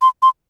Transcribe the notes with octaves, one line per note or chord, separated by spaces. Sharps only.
C6
C6